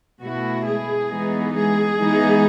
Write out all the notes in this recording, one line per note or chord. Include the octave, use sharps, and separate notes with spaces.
B2 A3 E4 F#4
G#3 G#4
E3 G#3 B3 D#4
G#3 G#4
E3 G#3 B3 D#4